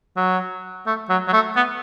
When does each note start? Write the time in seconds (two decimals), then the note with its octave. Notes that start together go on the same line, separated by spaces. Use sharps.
0.16 F#3
0.86 A3
1.09 F#3
1.28 F#3
1.33 A3
1.56 B3